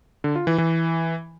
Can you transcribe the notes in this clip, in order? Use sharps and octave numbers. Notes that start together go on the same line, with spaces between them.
D3
F4
E3
E3